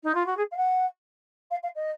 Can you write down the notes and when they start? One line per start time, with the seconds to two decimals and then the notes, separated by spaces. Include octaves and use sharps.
0.03 D#4
0.14 F4
0.26 F#4
0.37 G#4
0.51 F5
0.56 F#5
1.51 F5
1.63 F5
1.75 D#5